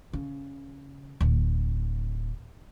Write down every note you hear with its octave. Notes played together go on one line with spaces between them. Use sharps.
C#3
D1